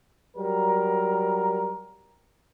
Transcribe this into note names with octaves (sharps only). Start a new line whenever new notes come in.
F#3 G3 A#4